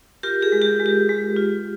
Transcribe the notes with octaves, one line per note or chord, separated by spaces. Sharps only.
F4 G4 A#4
G#4
G#3
G4
G#3
G4
G#3
F4